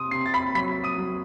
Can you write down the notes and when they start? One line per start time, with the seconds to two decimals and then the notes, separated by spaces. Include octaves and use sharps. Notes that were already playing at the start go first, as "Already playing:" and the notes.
Already playing: C3 C6 D#6 D#7
0.11 C3 C6 C7
0.26 A6
0.34 B5 B6
0.55 F#3 B5 B6
0.84 D#6 D#7
0.98 F#3